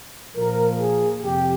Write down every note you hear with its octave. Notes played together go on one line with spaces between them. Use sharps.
A#2 F3 A#3 A#4
G#4
F2 C3 F3 G4